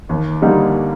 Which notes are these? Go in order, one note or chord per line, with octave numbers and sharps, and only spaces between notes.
D#2
D3 G3 A#3 D#4